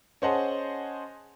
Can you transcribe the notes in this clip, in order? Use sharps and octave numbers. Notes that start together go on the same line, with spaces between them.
C#4 G#4 C5 D#5 F#5 A5